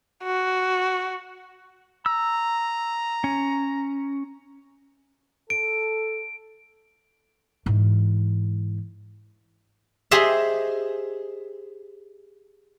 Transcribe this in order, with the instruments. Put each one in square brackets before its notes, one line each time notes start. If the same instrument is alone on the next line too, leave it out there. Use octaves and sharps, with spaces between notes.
[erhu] F#4
[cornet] A#5 [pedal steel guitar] E6
[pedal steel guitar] C#4
[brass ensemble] A4 [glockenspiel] D7
[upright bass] G#2 E3
[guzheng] G4 G#4 C5 D#5 E5